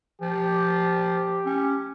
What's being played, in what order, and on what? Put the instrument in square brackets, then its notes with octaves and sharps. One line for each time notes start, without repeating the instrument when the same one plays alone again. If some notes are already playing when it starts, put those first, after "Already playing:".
[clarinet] F3 [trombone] G4
[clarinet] C#4